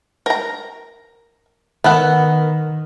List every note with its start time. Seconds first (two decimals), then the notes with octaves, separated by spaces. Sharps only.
0.26 A#4 A#5
1.84 D#3 B3 A4 F#5